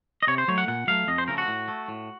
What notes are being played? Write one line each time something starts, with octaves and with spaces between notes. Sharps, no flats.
D#5
C3 C#5
C5
F#3 A3 C#5
F#5
A#2 F#5
F#3 A3 F5
F2 D#5
C5
C#3 F3 A3 A#4
F#4
A2
A3
A2